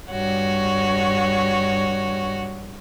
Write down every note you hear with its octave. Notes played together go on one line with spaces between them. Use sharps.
G2 F#4 C#5